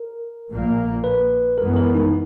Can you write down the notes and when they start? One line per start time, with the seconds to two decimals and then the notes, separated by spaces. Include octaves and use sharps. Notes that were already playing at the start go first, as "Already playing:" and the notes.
Already playing: A#4
0.49 A#1 A#2 A#3
1.04 B4
1.58 F#2 E3 G#3 B3 A#4
1.76 A#4
1.95 D#4